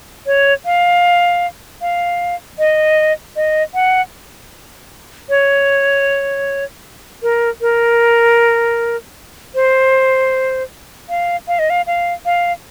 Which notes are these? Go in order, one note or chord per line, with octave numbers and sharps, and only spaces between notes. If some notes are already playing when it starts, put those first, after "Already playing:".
C#5
F5
F5
D#5
D#5
F#5
C#5
A#4
A#4
C5
F5
F5
D#5
F5
F5
F5